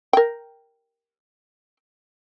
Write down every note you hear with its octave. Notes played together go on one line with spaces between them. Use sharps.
A#4 G5